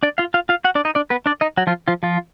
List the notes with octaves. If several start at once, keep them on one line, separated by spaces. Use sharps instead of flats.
D4 D5
F4 F5
F4 F5
F4 F5
F#4 F#5
D4 D5
D#4 D#5
D4 D5
B3 B4
D4 D5
D#4 D#5
F#3 F#4
F3 F4
F3 F4
F3 F4